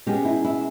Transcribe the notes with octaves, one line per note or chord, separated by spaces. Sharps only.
B2 G#3 C#4 G4
E4
E4